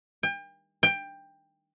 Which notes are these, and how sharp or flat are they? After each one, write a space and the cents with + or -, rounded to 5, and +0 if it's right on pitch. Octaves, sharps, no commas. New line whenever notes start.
G5 +35
G5 +15